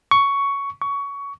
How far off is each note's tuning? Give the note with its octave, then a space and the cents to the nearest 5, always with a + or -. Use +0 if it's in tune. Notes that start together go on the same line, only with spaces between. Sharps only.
C#6 +10
C#6 +20